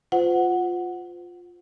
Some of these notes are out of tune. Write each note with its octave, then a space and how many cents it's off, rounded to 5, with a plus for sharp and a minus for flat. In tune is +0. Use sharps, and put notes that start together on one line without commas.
F4 +10 C5 -35 F#5 +0